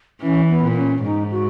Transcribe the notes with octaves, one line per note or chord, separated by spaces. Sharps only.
E3 C#4
B3
A#2
C#4
G#2 D#4
F#4